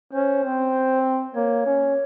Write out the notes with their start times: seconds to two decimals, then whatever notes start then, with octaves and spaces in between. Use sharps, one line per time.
0.13 C#4 C5
0.44 C4
1.35 A#3 C#5
1.66 C#4